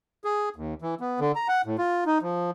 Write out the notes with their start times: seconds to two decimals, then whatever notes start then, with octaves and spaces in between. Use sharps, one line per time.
0.24 G#4
0.56 D#2
0.82 E3
1.00 B3
1.20 D3
1.35 A#5
1.48 F#5
1.65 A2
1.78 F4
2.06 D#4
2.22 F3